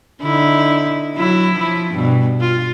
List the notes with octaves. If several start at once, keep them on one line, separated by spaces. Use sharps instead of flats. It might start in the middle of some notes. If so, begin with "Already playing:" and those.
D3 D#4 E4
F#3 E4
F3 E4
G2 B2
F4